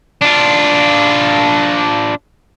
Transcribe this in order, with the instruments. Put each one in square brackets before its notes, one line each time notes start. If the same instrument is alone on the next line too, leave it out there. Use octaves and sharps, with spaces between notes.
[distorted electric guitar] D4 F4